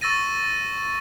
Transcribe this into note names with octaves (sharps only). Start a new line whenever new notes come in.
C#6 E6 A6 A#6 D#7